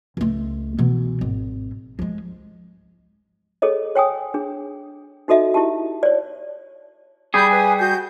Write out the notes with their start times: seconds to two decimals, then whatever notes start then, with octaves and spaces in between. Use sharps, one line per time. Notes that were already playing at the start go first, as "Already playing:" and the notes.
0.17 C#2 A3
0.79 B2 E3
1.21 G#1
1.99 F3 G#3
3.62 G#4 A4 C#5 D#5
3.95 C#5 G5 G#5 D#6
4.34 D4 G#4
5.28 D#4 F#4 A4 D#5 E5
5.54 E4 G4 A5
6.03 C#5 D5
7.34 G3 G#4 B5 G6
7.50 B4 G#5
7.78 F#4 G6